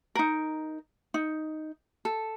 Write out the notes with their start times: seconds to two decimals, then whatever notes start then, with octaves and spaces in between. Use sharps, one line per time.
0.15 D#4 A#4
1.14 D#4
2.05 A4